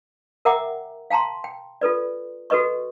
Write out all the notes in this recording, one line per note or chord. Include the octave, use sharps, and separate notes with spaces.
A#4 E5 F#5 G5 A#5 D6
F5 G5 A5 A#5 C6
G5
F4 A4 B4 D5
F#4 A4 B4 D#5 C#6